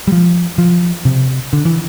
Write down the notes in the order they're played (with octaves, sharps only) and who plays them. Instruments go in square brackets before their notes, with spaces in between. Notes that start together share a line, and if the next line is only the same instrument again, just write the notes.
[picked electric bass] G3
F3
F3
C3
D3
E3